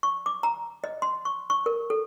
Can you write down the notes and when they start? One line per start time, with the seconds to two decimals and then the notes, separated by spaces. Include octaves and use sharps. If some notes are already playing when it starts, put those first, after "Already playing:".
0.03 C#6
0.26 D6
0.43 A#5
0.84 D#5
1.02 C6
1.25 C#6
1.50 C#6
1.66 A#4
1.90 A4